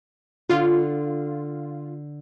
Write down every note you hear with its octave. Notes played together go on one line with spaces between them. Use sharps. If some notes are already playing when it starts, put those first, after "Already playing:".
D3 F4